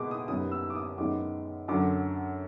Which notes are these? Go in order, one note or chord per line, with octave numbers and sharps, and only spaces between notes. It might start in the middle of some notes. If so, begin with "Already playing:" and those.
Already playing: B2 G#3 B3 D6
D#6
F#2 D#3 G3 B3 D#6
E6
D6
D#6
F#2 D#3 G#3 B3 D6
F#2 D3 F#3 D6